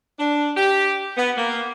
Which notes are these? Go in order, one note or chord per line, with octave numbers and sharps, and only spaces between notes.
D4
G4
B3
A#3